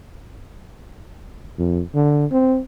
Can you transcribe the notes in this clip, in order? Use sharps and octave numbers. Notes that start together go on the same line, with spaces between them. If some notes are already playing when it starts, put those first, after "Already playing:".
F2
D3
C4